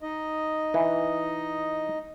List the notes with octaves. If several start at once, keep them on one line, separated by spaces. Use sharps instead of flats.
D#4 D#5
E3